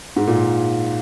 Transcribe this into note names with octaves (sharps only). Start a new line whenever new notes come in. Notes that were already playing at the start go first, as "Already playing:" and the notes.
G#2
A#2